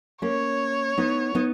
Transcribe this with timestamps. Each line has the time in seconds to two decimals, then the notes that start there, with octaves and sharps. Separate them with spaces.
0.22 A#3 C#4 C#5
0.98 B3 D#4
1.35 B3 D#4